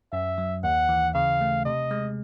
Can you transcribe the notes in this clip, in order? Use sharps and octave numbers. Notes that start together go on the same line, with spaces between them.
F#2 E5
F#3
D#2 F#5
E3
C#3 F5
A3
C3 D#5
G#3